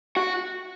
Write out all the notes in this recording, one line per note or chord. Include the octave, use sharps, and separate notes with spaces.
F#4